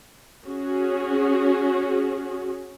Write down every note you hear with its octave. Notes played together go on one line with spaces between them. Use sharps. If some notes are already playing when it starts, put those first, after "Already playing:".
C#4 F#4 G#4